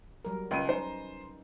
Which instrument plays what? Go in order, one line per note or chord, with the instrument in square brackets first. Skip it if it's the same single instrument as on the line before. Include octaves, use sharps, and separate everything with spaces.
[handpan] F#3 G3 A#4
[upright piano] C#2 D#7 [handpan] C#4 B4
[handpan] D#4 [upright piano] C5